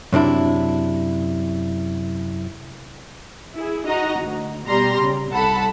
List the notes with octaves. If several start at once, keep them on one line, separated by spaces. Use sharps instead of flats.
F#2 C3 D4 E4
E4 G#4
D#4 F#4 D#5 A#5
D2
B2 G3 A#5 C6
C#3
C2 A4 F#5 A5 B5